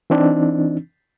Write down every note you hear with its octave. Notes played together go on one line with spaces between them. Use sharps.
E3 C4 D4 D#4